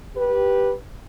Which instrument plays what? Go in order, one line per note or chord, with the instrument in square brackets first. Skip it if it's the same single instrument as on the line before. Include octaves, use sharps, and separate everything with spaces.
[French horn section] G4 B4